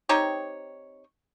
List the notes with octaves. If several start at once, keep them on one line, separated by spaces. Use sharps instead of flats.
C4 D#4 G4 C#5